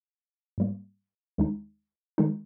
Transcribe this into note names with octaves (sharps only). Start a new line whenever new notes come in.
G#2 G3 A#3
D#2 D#3 G#3 D#4
D#3 G#3 D#4